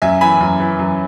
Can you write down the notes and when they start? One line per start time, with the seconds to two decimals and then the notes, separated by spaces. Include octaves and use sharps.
0.02 F#2 E5 G#5
0.21 E3 G#5 B5
0.41 F#2
0.60 E3
0.79 F#2